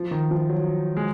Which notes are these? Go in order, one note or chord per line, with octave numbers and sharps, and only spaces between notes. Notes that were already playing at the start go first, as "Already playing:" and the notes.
Already playing: F3
D#3
F3
F#3
G#3